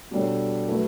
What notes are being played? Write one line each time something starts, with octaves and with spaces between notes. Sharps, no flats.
B2 G3 D4 A4 C#5
F#3 A3 E4 B4